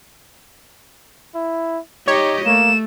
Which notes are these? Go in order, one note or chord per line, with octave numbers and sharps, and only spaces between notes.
E4
D#4 G4 C#5 D#5
A3 A#3 E7